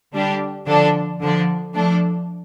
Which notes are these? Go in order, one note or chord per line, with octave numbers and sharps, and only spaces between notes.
D3 G3 D4 G4
D3 F3 D4 A4
D3 F3 D4
F3 A3 D4 A4